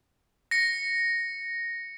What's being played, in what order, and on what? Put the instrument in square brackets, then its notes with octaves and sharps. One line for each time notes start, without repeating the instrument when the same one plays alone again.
[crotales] A#6 C#7